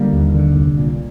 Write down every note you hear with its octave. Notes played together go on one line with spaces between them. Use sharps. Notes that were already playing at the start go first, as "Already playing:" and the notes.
Already playing: D3 G3 A#3
D#2
D3
C2
A#2